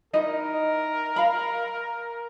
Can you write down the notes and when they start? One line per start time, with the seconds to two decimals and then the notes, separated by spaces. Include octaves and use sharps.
0.13 D#4 E4 A#4 D#5
1.16 F5 B5